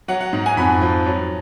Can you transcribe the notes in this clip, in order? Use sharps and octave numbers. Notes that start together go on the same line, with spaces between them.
F#3 F#5
F#5
G#2 F#5
G#5
F2 B5
F3
F#3